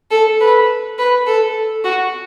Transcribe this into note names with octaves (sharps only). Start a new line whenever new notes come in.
A4
B4
B4
A4
F#4